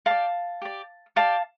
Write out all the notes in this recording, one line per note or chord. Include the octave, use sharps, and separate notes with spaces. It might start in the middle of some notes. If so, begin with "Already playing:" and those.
G4 D5 F5 A5
G4 D5
G4 D5 F5 A5